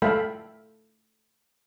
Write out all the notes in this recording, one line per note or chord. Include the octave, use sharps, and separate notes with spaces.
A3 A4 E5 F5 G5 B5